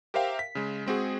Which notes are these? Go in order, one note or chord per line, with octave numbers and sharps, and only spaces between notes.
G4 A#4 C5 E5 F5 G5
B6
C#3 G#3
G#3 C4 F#4 G#4